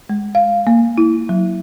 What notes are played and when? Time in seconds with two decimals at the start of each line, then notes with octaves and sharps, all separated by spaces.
0.09 G#3
0.35 F5
0.67 A#3
0.98 E4
1.29 F#3